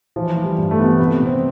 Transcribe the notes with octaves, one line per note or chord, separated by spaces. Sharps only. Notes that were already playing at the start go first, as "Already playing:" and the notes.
E3 F3
E3
G3
G2
A3
E3 B3
A3
C3 B3
C3
C4